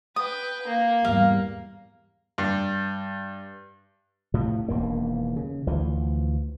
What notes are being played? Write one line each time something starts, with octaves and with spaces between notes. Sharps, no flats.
B4 G5 D#6
A#3
E2 G#2 G3 F5
G2
A2 C3 F3
E1 D#2 A#3
C#3
D2 E3 F3